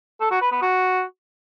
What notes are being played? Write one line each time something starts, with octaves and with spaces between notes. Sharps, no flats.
A4
F#4
B4
B3
F#4